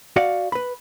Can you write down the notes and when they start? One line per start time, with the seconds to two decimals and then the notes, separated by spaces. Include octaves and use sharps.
0.16 F#4 D5 F5 F#5
0.52 B4 B5